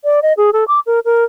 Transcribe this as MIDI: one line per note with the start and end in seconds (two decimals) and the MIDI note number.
0.04 0.20 74
0.23 0.33 75
0.37 0.50 68
0.53 0.64 69
0.68 0.80 86
0.86 1.00 70
1.05 1.24 70